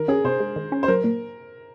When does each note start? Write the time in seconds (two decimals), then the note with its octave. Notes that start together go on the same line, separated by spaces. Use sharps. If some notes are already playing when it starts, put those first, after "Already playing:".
Already playing: D#3 A#4
0.08 C#4 G#4
0.24 C3 C5
0.40 G#3
0.56 D#3
0.72 C#4
0.83 C5
0.88 F#3 A#4
1.04 A#2